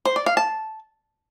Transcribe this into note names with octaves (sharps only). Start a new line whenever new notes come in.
C5
D5
F5
A5